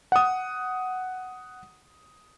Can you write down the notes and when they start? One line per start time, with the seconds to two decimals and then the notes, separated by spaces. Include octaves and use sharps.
0.12 F#5 D#6